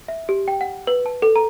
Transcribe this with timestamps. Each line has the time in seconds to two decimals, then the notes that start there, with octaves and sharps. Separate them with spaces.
0.08 E5
0.29 G4
0.48 G5
0.61 F#5
0.87 B4
1.06 A5
1.22 A4
1.36 A#5